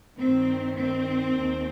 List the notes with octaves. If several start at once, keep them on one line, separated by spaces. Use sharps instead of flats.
G2 D#3 C4
C4
D#2 D#3